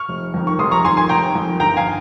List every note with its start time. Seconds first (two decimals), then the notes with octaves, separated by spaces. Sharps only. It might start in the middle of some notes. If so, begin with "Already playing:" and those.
Already playing: C#6 F6
0.09 F1
0.34 F2 D#3
0.47 C#6
0.58 F1 C6 D#6
0.71 A#5 C#6
0.85 F2 D#3 G#5 C6
0.97 G#5 C6
1.09 F1 G5 A#5
1.35 F2 D#3
1.59 G1 G5 A#5
1.77 F5 G#5